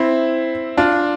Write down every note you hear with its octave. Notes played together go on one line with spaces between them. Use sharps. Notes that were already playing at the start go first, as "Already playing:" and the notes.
Already playing: C4 E4
D4 F4